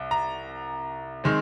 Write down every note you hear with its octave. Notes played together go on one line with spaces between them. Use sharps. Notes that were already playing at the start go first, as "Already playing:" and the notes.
Already playing: C2
A#5
D#3 G#3 C4